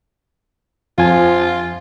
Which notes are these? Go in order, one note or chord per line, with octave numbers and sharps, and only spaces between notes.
F2 F3 F4 G#5